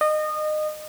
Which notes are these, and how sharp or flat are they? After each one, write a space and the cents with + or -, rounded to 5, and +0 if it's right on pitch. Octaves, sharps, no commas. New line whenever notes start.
D#5 -25